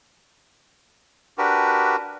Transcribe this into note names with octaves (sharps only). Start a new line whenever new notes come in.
D4 F#4 G4 A#4 B4